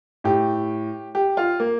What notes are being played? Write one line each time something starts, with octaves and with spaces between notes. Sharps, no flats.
A2 G4
G4
F4
A#3